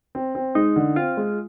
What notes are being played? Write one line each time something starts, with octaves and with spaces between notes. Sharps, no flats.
C4
C4
G#3 D#4
D3
C4 F4
G#3